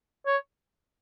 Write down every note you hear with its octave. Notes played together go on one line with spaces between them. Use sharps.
C#5